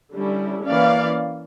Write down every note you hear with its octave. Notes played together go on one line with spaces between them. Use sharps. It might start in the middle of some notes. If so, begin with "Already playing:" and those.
D3 G3 C#4 E4
E3 A#3 C#4 D5 F5